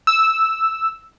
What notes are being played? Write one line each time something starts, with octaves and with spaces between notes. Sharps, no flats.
E6